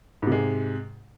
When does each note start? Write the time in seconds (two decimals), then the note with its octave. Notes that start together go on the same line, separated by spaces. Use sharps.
0.22 G#2
0.27 C3
0.32 G#3